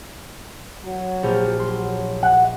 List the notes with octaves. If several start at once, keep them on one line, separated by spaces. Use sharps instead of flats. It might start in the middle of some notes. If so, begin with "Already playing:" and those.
F#3
A#1 G4 F6
F#3 C6
F#5